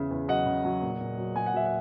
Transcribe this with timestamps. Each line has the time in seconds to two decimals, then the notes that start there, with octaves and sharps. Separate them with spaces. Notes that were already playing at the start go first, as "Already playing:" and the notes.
Already playing: E2 C#3 E5
0.11 E2
0.28 F#3 D#5 F#5
0.46 C#3
0.65 F#3
0.82 A#2
1.01 A#2
1.18 F#3
1.36 F#3 G#5
1.46 F#5
1.54 F#3 E5
1.66 F#5